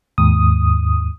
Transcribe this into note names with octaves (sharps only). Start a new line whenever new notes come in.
D#2 G#2 D#6